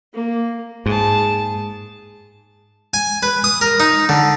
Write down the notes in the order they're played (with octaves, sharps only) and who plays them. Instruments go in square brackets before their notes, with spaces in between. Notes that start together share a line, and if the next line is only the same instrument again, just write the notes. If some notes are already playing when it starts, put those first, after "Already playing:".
[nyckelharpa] A#3
[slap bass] G#2 [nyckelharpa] G#4 A5
[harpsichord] G#5
B4
D#6
A#4
D#4
D3